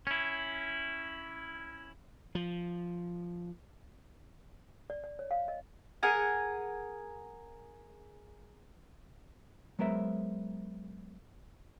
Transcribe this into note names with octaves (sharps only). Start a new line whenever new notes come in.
C#4 E4
F3
D5
D5
C#5
F5
D#5
G#4 A#4 F#5 G#5
F#3 G#3 B3 A#4 C5 E5